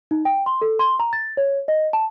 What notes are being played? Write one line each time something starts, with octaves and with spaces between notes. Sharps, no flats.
D#4
G5
C6
A4
C6
A#5
A6
C#5
D#5
A5